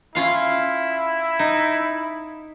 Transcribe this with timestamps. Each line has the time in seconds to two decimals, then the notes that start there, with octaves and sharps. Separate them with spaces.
0.15 C#4 E4 F4 F5
1.39 D#4